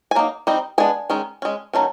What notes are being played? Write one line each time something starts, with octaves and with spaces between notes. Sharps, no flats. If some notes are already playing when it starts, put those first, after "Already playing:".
G#5
F#3 A#3 D#4
G3 C4 D#4
G#3 B3 D4 G#5
D#3 G#3 C#4
G#3 C#4
D#3 F#3 A3 C#4